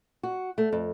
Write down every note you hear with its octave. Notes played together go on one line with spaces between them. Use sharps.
F#4
A3
F2